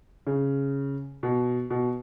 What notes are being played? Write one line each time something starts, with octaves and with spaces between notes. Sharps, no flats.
C#3
B2
B2